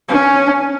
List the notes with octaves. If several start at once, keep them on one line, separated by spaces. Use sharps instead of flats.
C#4